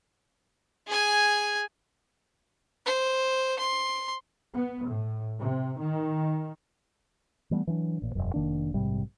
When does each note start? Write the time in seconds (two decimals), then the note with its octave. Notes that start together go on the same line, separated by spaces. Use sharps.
0.88 G#4 G#5
2.86 C5
3.59 C6
4.54 B3
4.87 A2
5.39 C3
5.78 D#3
7.51 E3 G3 A3 B3
7.67 E3 F#3 D4
8.02 A1 A#2
8.15 E1 A#1 F#2
8.34 F1 D#3 A#3 D4
8.74 A#1 G#2 C3 G3